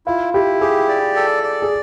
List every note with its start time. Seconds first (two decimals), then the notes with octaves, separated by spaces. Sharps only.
0.06 E4 F4
0.34 E4 G4
0.61 G4 G#4
0.88 D5
1.16 A4
1.43 D5
1.62 G#4